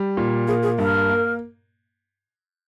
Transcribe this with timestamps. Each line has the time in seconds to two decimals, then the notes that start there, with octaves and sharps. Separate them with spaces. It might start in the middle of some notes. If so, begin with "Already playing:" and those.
Already playing: G3
0.17 A#2
0.47 A#3 G#4
0.63 G#4
0.78 G2 A#4
1.09 A#3